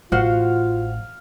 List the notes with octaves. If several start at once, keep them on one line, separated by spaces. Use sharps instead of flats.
A1 F4 F#4 C5 F5 F#5